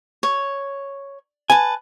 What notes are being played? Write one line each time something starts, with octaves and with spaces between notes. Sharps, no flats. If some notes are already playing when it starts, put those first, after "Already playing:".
C#5
B4 G#5 A5